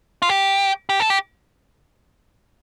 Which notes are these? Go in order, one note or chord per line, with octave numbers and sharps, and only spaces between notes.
F4
G4
G4
A4
G4